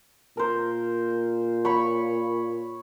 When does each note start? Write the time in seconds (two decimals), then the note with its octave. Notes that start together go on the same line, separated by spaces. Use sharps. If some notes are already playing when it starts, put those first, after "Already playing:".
0.37 A#2 A#4 C5
1.65 C#5 B5 C#6